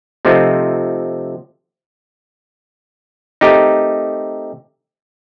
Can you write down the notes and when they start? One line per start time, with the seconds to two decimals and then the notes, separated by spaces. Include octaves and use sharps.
0.25 C3 F3 A3 C4 D#4
3.41 A3 C4 D#4 G4 A#4